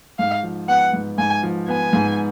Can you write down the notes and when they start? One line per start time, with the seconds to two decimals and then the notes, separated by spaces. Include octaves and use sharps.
0.19 G#2 F5
0.43 F3
0.68 B3 F#5
0.93 G#2
1.18 G#2 G#5
1.43 F3
1.68 B3 G#5
1.93 G#2